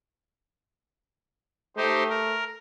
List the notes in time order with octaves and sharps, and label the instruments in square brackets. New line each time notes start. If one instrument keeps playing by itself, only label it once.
[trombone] A3 [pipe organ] D#4 G4 C5
[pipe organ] A#4